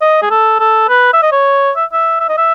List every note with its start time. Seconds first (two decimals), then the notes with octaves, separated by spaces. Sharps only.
0.01 D#5
0.22 G#4
0.31 A4
0.60 A4
0.89 B4
1.13 E5
1.23 D#5
1.32 C#5
1.76 E5
1.93 E5
2.20 E5
2.29 D#5
2.37 E5